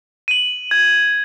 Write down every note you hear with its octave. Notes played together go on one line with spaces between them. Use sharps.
D#7 F#7
G#6